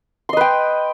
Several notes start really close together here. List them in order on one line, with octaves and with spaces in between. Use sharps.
C6 D#5 B4 G5